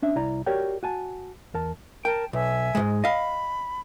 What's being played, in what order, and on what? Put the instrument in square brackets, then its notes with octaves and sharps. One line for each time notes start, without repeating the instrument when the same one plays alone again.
[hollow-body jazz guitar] C#4 D4 E5
C2 E4 D5 A#5
F#4 G4 A#4 C#5 D5 G5
F#4 G#5 A5
E2 A#4 A5
[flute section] A#4 A5 [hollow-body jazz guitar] G5
[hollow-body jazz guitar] B1 [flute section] E5 G#5
[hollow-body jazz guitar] G#2 B2 G#3
[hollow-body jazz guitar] D#5 F5 [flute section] B5